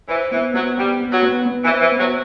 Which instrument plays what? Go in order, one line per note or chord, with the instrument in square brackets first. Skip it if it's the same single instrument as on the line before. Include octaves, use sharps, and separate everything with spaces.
[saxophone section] E3 [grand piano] C5
[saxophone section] E3 [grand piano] B3
[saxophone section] F#3 [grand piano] B3
[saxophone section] G3 [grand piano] B3
[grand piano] B3
[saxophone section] F#3
[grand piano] B3
B3
[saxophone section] E3
[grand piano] C5
[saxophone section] E3
[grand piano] B3
[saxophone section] F#3